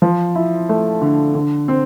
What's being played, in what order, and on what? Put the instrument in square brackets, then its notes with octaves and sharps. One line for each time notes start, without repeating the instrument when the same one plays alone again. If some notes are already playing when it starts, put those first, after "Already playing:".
[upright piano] F3
E4
A3
D3
D3
C4